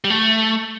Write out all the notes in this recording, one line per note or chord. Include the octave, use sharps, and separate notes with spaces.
G3
A3